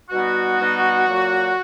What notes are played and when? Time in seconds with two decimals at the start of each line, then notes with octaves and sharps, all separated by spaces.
0.10 B2 G3 B3 D#4 F#4
0.58 B2 G3 B3 D#4
1.07 A#2 F#3 A#3